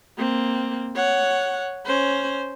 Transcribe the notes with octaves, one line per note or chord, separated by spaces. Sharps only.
A#3 C4
C#5 F#5
C#4 C5